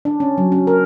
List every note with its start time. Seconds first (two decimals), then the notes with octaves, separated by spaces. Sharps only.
0.05 D4
0.20 C#4
0.38 F#3
0.52 C#4
0.67 A#4